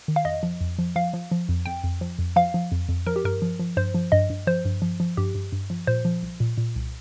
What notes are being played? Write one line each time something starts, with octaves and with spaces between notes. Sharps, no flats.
D#3
F5
F2 D#5
F3
F2
F3
F3 F5
F3
F3
F2
F2 G5
F2
F3
F2
F3 F5
F3
F2
F2
F3 A#4
G4
G2 A#4
F3
F3
G2 C5
F3
G2 D#5
G2
F3 C5
G2
F3
F3
G2 G4
G2
G2
F3
A#2 C5
F3
C2
A#2
A#2
C2